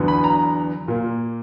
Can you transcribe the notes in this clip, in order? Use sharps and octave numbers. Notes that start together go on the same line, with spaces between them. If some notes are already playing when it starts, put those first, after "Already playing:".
Already playing: E2 D3 F#3 B3
B5
A#5
A#2 A#3